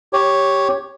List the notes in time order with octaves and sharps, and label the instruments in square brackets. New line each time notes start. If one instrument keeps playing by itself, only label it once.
[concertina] G4 C#5